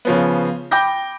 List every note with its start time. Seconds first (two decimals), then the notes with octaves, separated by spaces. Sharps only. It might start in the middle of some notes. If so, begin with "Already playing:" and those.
0.05 C#3 F3 B3
0.71 G5 B5 D6 G6 A#6